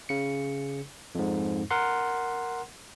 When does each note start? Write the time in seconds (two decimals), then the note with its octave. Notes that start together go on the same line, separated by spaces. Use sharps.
0.09 C#3 C#7
1.15 F2 G#2
1.71 A#4 F#5 C6